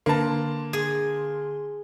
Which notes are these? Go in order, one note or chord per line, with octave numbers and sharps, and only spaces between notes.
D3 A#3 B4 A5 C6
G#4